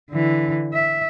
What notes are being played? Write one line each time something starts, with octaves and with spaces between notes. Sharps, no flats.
D3 E3
E5